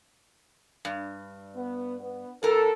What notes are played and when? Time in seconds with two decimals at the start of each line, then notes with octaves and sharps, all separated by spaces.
0.85 G2
1.56 B3
2.00 B3
2.43 A2 A4 A#4